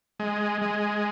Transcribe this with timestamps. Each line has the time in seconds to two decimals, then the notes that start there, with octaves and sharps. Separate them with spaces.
0.20 G#3
0.62 G#3